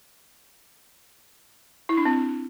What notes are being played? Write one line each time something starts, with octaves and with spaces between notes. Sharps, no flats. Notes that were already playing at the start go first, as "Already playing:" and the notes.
E4
D4
C4